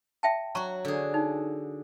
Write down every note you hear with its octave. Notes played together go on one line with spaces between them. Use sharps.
E5 G5 A5
F#3 F#4 A#5 C#6
D3 G#4
D#4